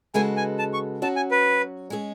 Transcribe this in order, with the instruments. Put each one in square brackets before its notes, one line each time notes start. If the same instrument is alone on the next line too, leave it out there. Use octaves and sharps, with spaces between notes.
[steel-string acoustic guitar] C#3 G#3 B3 F#4 A4 [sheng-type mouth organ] G#5
[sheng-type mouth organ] G#5
A5
C#6
[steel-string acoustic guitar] F#3 C#4 F#4 [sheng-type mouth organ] A5
[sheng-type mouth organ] G#5
B4
[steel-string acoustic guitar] G#3 C#4 G#4